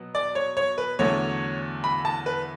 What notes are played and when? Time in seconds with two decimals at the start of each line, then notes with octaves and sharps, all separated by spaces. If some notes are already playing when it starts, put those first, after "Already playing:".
Already playing: B2 F#3 B3
0.15 D5
0.35 C#5
0.57 C#5
0.78 B4
0.99 E2 D3 F#3 A3 C#5
1.84 B5
2.05 A5
2.26 B4